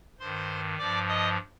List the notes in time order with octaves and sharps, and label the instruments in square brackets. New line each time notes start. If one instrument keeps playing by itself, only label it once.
[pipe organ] G2 D#3 C5 C6
G2 F3 D5 D6
D#5 D#6